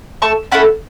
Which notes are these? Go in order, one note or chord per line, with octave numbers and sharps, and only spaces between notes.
A3 A5 C#6
C#4 E4 A4 F#5 B5